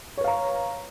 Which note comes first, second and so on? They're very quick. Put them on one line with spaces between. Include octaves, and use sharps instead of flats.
C#5 B4 F5 A#5